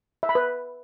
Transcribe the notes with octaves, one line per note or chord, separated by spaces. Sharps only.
E5
B5
B4